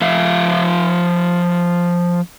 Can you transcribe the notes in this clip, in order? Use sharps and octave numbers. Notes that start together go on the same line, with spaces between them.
F3 E5 F5